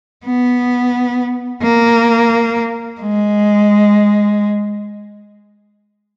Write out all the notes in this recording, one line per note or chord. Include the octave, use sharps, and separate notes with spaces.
B3
A#3
G#3